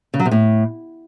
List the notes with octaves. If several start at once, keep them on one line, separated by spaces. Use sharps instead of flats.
C#3
F#3
C3
A2